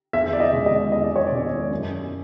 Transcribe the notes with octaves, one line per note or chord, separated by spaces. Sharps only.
E2 E5
D5
D#5
B2 G#3 C#4
D#5
E2 D#5
D5
C#5
D5
B2 G#3 C#4
F#2